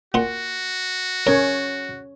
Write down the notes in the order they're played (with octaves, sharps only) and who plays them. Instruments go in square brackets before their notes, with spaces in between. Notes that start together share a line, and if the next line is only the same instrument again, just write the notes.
[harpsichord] A#2 F#5 C6 [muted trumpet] F#4
[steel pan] C#4 C#5 [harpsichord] A#4